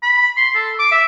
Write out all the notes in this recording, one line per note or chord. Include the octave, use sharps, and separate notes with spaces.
B5
C6
A4
D6
E5